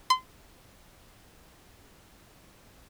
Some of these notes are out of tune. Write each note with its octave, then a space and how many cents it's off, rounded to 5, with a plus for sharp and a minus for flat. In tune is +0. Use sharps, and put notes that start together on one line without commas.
C6 -30